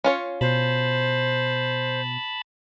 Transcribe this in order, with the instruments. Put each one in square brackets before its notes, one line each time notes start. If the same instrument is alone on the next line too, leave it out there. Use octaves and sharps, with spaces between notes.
[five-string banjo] C#4 F4 C#5
[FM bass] B2 [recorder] C5 [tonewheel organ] A5 B5